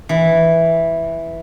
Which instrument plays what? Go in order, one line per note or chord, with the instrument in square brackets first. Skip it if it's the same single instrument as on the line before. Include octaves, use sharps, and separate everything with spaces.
[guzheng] E3